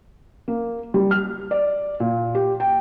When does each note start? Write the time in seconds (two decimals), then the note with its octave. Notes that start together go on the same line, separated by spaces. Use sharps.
0.48 A#3
0.94 G3
1.11 F6
1.51 D5
2.00 A#2
2.35 G4
2.60 G5